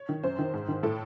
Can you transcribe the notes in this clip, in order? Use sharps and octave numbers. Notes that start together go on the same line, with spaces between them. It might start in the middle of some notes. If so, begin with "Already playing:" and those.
Already playing: C#5
D#3
F#2 C5
D#3
G#2
D#3
A2 A4